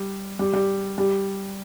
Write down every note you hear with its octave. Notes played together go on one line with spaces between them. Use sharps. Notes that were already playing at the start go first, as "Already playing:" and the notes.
Already playing: G3
G3
G3
G3